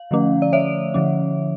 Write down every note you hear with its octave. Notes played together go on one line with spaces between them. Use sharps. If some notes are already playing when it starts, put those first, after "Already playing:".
Already playing: F5
D3 F3 A3 C#4
D5
C#5 E5
D3 F3 C#4